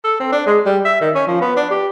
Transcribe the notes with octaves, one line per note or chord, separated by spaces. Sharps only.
A4
C4
D4
G#3
G3
E5
D#3
C#4
F3
B3
D4
G4